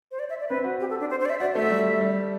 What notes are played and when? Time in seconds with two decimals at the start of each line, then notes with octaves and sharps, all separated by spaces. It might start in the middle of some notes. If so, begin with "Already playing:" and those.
0.11 C5
0.19 D5
0.30 E5
0.40 D5
0.49 C4 B4
0.64 F#4
0.80 G4
0.90 A4
1.00 D4
1.10 C5
1.21 C5
1.25 D5
1.30 E5
1.40 F#4 D5
1.55 A3 E5
1.70 G3
2.01 G3